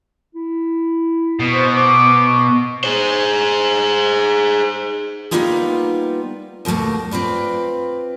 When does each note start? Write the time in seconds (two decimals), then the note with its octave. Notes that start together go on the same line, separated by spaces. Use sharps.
0.35 E4
1.40 B2
1.54 C5
1.76 D6
2.23 C#6
2.84 G#4 C5
5.31 G3 A#3 B3 D#4 F4 G#4
6.65 D#2 B2 D#3 A3 A#3
7.11 C4 F4 B4 D5